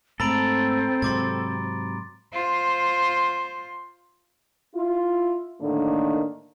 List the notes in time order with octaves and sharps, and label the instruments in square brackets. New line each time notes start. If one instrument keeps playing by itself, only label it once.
[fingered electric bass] G#2 A3 [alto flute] C4 [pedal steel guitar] A4 [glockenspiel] A#5 B5 D7
[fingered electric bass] G#2 C3 F#3 [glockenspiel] C6 D6 A6
[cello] F4 C5
[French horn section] E4 F4
A2 D3 D#3 A#3 D4